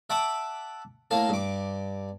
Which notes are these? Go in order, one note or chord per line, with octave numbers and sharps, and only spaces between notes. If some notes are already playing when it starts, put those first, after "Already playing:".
E5 F#5 A5 B5 D6
A2 A#3 F5 A5
G2 D6